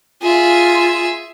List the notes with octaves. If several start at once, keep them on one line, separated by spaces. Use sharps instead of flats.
F4 G#4 E5